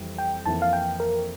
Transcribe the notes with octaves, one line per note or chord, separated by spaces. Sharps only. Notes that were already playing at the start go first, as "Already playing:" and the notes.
Already playing: F2 E3 G3
G5
F2 E3 A#3 E4 A5
F5
G5
A#4